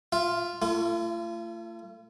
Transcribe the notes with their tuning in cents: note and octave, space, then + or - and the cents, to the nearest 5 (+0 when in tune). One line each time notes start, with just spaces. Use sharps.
F4 +0 E5 +40
A3 +30 F4 -40